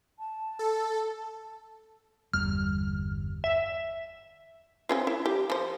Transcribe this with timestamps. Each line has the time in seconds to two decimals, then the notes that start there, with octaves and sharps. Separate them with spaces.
0.19 A5
0.59 A4
2.33 G1 E2 G3 F6
3.44 E5
4.89 C4 C#4 F4
5.07 E4
5.26 G4
5.50 F3 C5